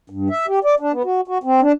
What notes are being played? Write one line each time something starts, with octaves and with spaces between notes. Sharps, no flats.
G2
E5
G4
D5
D4
B3
F#4
F#4
C4
D4